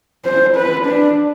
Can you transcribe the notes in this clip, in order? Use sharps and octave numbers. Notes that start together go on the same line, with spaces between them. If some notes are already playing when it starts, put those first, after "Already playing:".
C5
B4
D4